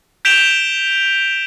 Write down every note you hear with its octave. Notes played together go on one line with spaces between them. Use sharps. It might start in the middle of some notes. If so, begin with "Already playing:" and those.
G6 B6 D7 E7 F7 G7